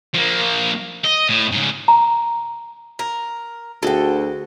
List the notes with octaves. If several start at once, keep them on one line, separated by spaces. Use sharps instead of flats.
F3 A#3
D#5
A2
G#2 C#3
A#5
A#4
D2 F#4 G#4 A4 G5